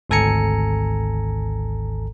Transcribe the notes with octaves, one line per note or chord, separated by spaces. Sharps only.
G#1 D2 A4 G#5 A#5 C#7